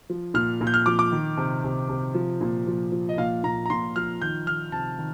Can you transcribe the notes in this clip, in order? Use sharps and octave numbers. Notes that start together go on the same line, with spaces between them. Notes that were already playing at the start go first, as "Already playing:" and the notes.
F3
A#2 F6
A#2
G6
F6
F3 D6
D6
D#3
C3
C3
C3
F3
A#2
F3
F3
D#5
A#2 F5
A#2 A#5
A#5
A#2 C6
F3 F6
D#3 G6
D#3 F6
C3 A5
D#3